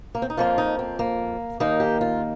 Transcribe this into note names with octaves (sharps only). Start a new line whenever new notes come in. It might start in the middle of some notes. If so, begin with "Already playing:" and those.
A#3
C4
D#4
F2 F3 A#3 F4
D#4
C4
A#3
D#2 D#3 A#3 D#4
G4
F4